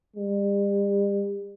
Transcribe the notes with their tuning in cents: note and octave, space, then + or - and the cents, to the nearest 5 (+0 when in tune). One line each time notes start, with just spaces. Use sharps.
G3 +40